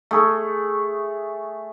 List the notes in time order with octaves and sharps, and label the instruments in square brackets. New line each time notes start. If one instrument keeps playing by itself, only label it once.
[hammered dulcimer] A3 G#4